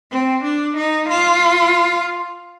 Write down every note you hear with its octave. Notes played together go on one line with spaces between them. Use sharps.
C4
D4
D#4
F4